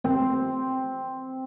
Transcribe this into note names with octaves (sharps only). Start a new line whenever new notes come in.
C4